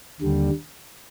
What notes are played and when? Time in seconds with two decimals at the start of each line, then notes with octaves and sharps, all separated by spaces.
0.21 D#2 D3 G3